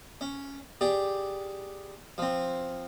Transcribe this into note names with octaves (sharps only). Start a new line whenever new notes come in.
C#4
G4 G#4 D5
F3 C4